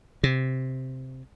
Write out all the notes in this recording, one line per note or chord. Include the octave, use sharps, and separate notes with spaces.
C3